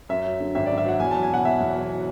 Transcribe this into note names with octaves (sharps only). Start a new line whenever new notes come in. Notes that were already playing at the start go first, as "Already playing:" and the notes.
F#2 E5
F#3
D3
G#1 E5
F#2 D5
E5
F#3 F#5
E2 G#5
F#3 A5
G#5
B2 F#5
E1 E5
E2
F#3